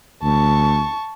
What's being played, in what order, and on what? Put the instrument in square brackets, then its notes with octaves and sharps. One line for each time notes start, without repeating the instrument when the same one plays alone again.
[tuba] D2 [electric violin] A5 C#6